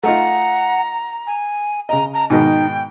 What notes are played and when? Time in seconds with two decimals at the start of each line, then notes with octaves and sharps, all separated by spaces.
0.03 A3 D#4 F4 F#5 A#5
1.27 G#5
1.89 C#3 D#5 A#5
2.14 A5 A#5
2.30 G#2 B2 D#3 D#4 G5